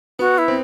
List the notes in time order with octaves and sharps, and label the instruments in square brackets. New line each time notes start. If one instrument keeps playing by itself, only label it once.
[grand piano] B3 [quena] F#4
[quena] E4
[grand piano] C4